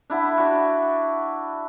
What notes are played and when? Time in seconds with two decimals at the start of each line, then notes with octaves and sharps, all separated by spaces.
0.10 D4 E4 F#5 B5
0.38 D4 F#4